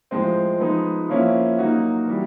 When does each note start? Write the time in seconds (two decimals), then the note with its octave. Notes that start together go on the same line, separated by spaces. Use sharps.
0.11 A2 F3 G#3 C4
0.60 F3 G#3 B3 D#4
1.09 F3 A#3 C#4 E4
1.58 F#3 A#3 D#4 F#4
2.07 E3 G3